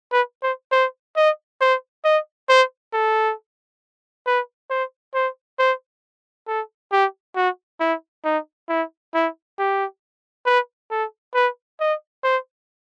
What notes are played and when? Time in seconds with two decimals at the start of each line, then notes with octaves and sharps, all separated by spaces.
0.13 B4
0.43 C5
0.72 C5
1.16 D#5
1.61 C5
2.05 D#5
2.49 C5
2.94 A4
4.27 B4
4.70 C5
5.15 C5
5.59 C5
6.47 A4
6.92 G4
7.36 F#4
7.80 E4
8.25 D#4
8.69 E4
9.14 E4
9.59 G4
10.46 B4
10.91 A4
11.34 B4
11.80 D#5
12.24 C5